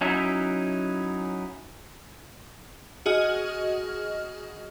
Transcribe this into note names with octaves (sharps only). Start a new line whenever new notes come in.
F#3 C#4 D#4 E4 E5
F#4 G#4 D#5 F6